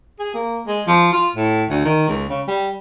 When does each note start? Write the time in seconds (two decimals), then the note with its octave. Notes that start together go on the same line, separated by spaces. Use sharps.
0.19 G#4
0.34 A#3
0.67 G#3
0.88 F3
1.13 F4
1.35 A2
1.70 D2
1.85 D#3
2.08 C#2
2.29 C#3
2.47 G3